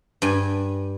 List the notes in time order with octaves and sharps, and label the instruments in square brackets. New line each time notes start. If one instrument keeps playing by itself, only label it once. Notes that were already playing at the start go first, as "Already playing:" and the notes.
[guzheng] G2 G#5